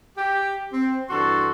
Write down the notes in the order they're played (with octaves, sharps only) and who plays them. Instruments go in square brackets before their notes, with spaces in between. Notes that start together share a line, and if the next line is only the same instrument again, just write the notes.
[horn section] G4
C4
G2 E3 D4 F#4 A4 C6